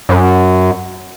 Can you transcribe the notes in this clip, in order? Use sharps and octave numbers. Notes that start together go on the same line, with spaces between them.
F#2